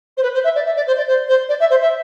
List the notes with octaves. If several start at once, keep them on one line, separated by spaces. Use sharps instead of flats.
C5
B4
C5
E5
D5
E5
D5
C5
D5
C5
C5
D5
E5
C5
E5